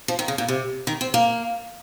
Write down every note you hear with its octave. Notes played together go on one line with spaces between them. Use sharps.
F3
D#3
C#3
A#2
C3
D#3
C4
A#3